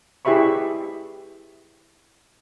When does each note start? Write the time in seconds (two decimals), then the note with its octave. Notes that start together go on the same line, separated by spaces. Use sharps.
0.25 E4 G4 G#4 E5 B5 C#6